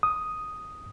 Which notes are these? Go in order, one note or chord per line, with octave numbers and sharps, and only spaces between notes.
D#6